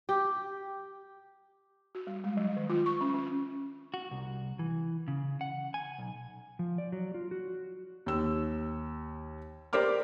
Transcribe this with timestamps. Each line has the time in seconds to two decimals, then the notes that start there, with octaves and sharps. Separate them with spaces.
0.09 G4
1.95 F#4
2.07 G3
2.24 G#3
2.37 F#3
2.56 D#3
2.70 F4
2.86 C#6
3.01 C#4
3.14 C#4
3.94 F#4
4.11 C2
4.59 E3
5.08 C#3
5.41 F#5
5.74 G#5
5.98 B1
6.59 F3
6.78 D5
6.92 F#3
7.14 F4
7.31 F#4
8.06 D#2 E6
9.73 G4 A#4 C5 D5 D6 F6